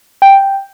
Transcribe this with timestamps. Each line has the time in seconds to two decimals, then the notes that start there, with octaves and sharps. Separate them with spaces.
0.22 G5